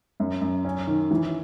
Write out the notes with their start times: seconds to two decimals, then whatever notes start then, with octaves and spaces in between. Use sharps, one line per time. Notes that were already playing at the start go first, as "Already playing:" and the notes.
0.20 F#2
0.41 F#2
0.65 C#4
0.87 D#3
1.11 E3